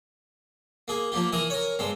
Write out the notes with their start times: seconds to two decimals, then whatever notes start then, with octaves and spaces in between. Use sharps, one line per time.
0.88 A#3 G#4
1.12 F3 A#3 G4
1.33 E3 A#4 D#6
1.50 A#4 C#5
1.79 G2 G#3 C4